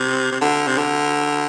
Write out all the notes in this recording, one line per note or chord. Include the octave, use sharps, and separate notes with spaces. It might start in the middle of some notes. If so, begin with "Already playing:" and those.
Already playing: C3
C3
D3
C3
D3